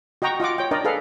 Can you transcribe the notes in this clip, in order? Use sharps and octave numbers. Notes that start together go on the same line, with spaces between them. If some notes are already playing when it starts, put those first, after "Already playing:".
F#4 D#5 G5 A#5 C#6
F4 D#5 F#5 D6
C#5 G5
D4 A#4 D5 D#5
G#4 A4 B4 F5